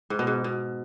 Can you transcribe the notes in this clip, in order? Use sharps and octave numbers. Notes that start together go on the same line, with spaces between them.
G#2
B2
G#2
B2